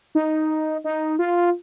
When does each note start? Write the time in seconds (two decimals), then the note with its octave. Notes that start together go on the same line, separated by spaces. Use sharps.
0.15 D#4
0.84 D#4
1.19 F4